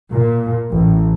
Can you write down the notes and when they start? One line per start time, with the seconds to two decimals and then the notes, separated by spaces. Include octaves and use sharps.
0.11 A#2
0.72 A1